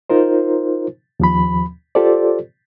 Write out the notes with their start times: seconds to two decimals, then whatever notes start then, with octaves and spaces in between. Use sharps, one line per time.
0.10 D#4 F4 A#4 C5
1.20 D#2 F3 B5
1.95 F4 G4 A4 C5 D5